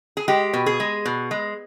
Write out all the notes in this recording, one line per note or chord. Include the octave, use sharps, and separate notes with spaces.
G#4
G#3 G4
B2
G#4
G#3
B2
G#3